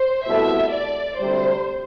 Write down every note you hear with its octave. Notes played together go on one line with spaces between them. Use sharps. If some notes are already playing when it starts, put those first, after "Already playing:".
Already playing: C5
C2 B2 A3 E4 A4 E5
D5
D2 C3 G3 C5